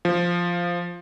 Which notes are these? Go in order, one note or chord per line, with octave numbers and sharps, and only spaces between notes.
F3